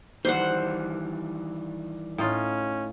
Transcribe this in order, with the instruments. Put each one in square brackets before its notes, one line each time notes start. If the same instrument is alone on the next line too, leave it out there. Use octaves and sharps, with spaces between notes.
[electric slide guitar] D#3 E3 G3 [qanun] C5 F#5
[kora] A2 D#4 F4 [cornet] C#4